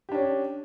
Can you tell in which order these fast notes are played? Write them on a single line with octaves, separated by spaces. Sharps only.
G4 D4 C#4